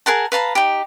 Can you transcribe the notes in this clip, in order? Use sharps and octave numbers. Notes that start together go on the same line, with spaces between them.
G#4 A#4 F#5 A5
B4 F5 A5 A#5
D#4 G4